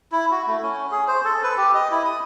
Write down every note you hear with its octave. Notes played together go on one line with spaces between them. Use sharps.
E4
F#4
A3
C#4
G#4
C5
A4
B4
G4
D#5
E4
D#6